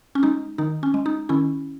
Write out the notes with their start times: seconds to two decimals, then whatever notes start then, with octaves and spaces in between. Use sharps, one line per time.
0.15 C#4
0.23 G#3 D#4
0.58 D#3 D#4
0.83 C#4
0.94 G#3
1.06 D#4
1.29 D#3 C#4 E4